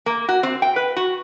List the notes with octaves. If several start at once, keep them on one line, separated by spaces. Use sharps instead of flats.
A#3
F#4
C4
G5
B4
F#4